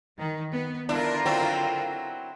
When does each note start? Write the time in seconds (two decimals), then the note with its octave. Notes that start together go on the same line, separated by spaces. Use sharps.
0.18 D#3
0.52 B3
0.89 D3 D4 E4 F4 A#4
1.26 F#3 C4 E4